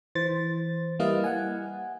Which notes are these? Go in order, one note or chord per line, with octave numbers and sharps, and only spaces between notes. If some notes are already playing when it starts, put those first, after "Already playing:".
E3 C5 A6
G3 A#3 E4 B4 D#5 F5
F#5 G#5